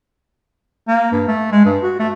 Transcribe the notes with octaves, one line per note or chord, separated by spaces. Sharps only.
A#3
G2
A3
G#3
G2
F#4
A3